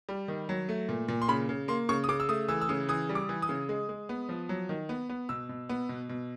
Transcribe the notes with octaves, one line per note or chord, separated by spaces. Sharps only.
G3
D#3
F#3
A3
A#2
A#2
C6
C#3 B5
C#3
A#3 C6
C#3 C#6
D#6
C#3 D6
E6
A3 D#6
E3 E6
E6
C#3 D#6
E3 D#6
G3
D6
E3
D#6
C#3
G#3
G#3
B3
F3
F#3
D#3
B3
B3
B2 E6
B2
B3
B2
B2